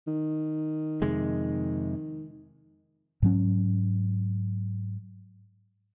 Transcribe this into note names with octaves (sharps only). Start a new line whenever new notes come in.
D#3
F2 C3 G#3
G#2 F#3 C#4